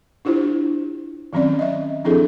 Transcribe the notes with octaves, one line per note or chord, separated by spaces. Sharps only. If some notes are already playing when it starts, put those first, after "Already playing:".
D4 E4 F4 G4 C5
D#3 F#3 C4 C#4 D5
D#5 E5
F3 C4 D4 E4 G#4 A4